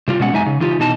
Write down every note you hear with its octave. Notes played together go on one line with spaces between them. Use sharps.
C3 G3 F4
B2 G#3 C#4 F#5
F#2 G#3 D#4 E5 G#5
C#3
E3 D#4 F4 G4
B2 E3 D#4 A5